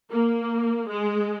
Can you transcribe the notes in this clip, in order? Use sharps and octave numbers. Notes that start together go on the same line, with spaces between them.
A#3
G#3